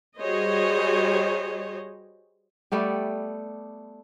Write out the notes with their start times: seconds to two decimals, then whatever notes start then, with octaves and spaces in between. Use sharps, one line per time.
0.20 G3 F#4 G#4 C5 C#5 D#5
2.72 G3 A3 B3 G4